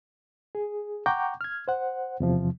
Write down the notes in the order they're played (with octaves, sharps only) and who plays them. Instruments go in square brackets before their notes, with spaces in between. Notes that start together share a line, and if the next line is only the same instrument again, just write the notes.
[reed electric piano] G#4
F#5 G5 A#5 C#6 D6 G6
F6 G#6
C5 F#5
E2 C3 F3